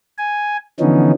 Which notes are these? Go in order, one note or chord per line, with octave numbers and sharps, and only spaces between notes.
G#5
D3 E3 F3 B3 C#4 D#4